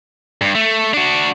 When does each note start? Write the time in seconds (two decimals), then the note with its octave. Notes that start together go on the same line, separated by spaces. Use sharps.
0.41 G2
0.55 A3
0.93 D4 F#4